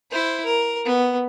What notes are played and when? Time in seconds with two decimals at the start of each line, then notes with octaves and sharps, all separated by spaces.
0.11 E4 C5
0.45 A#4
0.85 B3